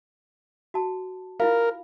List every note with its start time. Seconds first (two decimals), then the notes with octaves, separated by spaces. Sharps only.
0.74 F#4 A5
1.40 E4 F4 A#4 F5